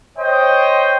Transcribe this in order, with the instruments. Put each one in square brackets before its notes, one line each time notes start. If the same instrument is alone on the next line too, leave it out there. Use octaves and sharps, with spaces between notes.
[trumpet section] C5 C#5 D#5 G5